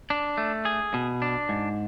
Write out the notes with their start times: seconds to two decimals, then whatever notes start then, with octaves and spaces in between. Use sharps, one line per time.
0.10 D4
0.38 A3
0.65 G#4
0.94 B2
1.22 D4
1.49 G#2